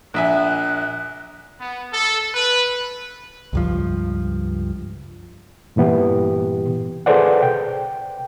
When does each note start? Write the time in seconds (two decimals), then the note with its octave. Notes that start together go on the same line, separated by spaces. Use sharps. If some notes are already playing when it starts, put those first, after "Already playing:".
0.14 A#1 E5 G#5 F#6
1.59 B3
1.93 A4
2.34 B4
3.53 C#2 G2 F3
5.76 G2 A#2 E3 B3 G4
7.06 G#4 A4 B4 C5 D5 F#5
7.43 G5